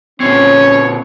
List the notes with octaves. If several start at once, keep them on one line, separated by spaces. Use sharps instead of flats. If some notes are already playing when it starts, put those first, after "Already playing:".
A#2 C4 C#4 C#5